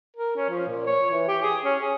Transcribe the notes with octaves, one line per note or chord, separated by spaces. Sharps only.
A#4
C#4
F3
A#2
C#5
E3
G4
G#4
C#4
G#4